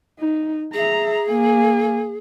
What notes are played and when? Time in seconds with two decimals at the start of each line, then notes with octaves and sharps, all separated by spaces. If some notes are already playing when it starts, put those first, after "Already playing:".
0.20 D#4
0.74 G#4 E5 A#5
1.29 A#3 G#5